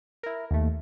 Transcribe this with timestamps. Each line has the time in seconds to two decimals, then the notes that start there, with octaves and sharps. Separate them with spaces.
0.23 E4 A#4
0.51 D#2 A3